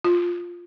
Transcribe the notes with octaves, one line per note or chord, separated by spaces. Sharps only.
F4